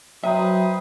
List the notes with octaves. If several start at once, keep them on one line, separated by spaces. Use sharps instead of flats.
F#3 B4 C5 E5 G5 A#5 D#6